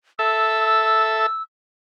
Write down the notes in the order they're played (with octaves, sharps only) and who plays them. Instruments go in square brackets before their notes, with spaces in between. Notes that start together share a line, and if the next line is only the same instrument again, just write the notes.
[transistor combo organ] A4 E5 [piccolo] E6